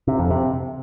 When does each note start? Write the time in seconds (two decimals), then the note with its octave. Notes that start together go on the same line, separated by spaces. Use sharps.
0.08 C3
0.19 F2
0.31 C3